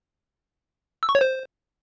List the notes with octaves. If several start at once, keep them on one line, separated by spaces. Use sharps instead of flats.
E6
C#6
C#5
C5